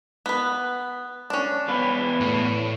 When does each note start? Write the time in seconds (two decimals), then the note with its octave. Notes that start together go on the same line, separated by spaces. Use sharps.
0.26 B3 B4
1.30 C#4 D4
1.68 E2 B4 F5
2.20 A2